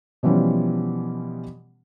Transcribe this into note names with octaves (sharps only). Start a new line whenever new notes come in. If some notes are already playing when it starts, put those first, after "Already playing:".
B2 E3 F3 G3 B3 C#4